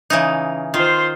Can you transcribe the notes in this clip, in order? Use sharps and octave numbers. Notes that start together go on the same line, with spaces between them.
C#3 E3 D#4
D#3 F4 C5